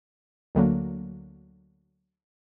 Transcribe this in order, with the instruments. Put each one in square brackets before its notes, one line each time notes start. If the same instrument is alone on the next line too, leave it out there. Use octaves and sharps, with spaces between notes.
[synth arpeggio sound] D2 D3 F#3 A#3